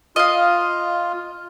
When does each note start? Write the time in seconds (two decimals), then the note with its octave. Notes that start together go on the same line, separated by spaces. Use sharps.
0.16 F4 D#5 F5